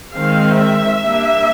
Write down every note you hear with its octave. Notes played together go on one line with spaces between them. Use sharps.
D#3 G#3 C4 F5
E5
G3 A#3 D4